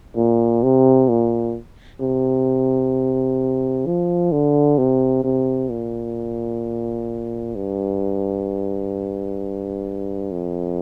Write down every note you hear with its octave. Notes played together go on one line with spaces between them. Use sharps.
A#2
C3
A#2
C3
F3
D3
C3
C3
A#2
G2
F2